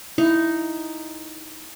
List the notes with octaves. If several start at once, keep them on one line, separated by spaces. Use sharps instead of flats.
D#4 E4